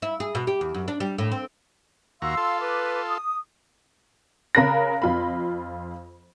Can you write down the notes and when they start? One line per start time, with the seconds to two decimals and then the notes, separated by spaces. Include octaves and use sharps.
0.02 E4
0.20 G#4
0.35 B2
0.47 G4
0.61 E2
0.74 F#2
0.88 D4
1.00 G3
1.18 A2
1.32 C4
2.22 D#2 F#4 F5 A#5 C6 E6
2.37 F4 A4
2.61 B4 D6
3.08 D#6
4.55 C#3 A#4 B5 F#6 A#6
5.02 F2 F4 B5